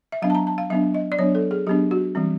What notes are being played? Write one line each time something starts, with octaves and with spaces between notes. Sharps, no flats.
E5
F#3 B3 D4 F5
A5
A#5
A5
F5
F#3 B3 D4 E5
D#5
D5
F#3 B3 D4 C#5
A4
G#4
F#3 B3 D4 G4
F#4
E3 G3 C4